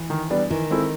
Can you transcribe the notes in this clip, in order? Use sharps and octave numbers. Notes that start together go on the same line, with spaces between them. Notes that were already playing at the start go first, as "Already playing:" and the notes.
Already playing: E3
D#3
G3 B3 D4
D#3 E3
G#3 C4 E4 A4